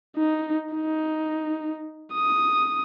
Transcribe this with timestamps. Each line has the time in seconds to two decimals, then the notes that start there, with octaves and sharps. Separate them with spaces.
0.17 D#4
0.74 D#4
2.14 D#6